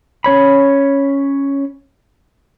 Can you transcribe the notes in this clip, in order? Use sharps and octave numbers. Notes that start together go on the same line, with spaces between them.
C#4 C#5 B5